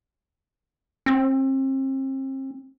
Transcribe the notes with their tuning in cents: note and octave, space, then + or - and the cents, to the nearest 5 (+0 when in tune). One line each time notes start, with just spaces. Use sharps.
C4 +35